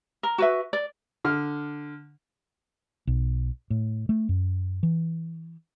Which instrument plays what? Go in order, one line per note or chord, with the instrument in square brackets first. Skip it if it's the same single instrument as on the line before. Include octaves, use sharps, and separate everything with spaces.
[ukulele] A#4
F#4 B4 E5
D5
[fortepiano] D3 F6
[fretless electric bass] B1
A2
A3
F#2
E3